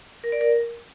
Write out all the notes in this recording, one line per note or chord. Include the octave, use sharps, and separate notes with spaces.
A#4
D5
A#4